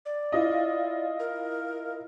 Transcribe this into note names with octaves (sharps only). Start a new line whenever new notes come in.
D5
E4 F4 D#5
A#4